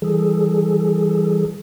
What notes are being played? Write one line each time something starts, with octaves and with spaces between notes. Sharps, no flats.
E3 G3 G#4 A4